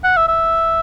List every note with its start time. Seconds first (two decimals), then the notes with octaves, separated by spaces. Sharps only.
0.04 F#5
0.16 E5
0.28 E5